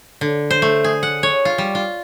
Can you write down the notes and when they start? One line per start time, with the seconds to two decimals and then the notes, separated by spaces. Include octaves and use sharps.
0.21 D3
0.51 C5
0.62 A3
0.84 G#4
1.03 F#5
1.23 C#5
1.45 F4
1.58 G3
1.75 F4